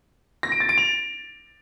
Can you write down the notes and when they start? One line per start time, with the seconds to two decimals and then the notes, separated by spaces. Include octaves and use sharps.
0.43 A#6
0.52 D7
0.60 A6
0.69 D7
0.78 F7